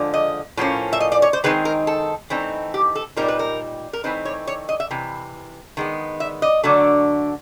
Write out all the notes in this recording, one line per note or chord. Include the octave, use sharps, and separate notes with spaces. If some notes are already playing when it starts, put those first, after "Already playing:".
Already playing: D3 F3 G#3
D#5
A2 F3 A#3 C#4
E5
D#5
D5
C#5
C5
D#3 G#3 C4 D#4 B4
A#4
A4
E3 A3 C4 D#4
G4
A4
A#2 G3 C4 D#4 A#4
B4
A#4
A#4
E3 A3 C4 D#4 B4
C#5
C#5
D#5
E5
C3 E3
D#3 G#3 B3
E5
D#5
D3 F#3 A3 D4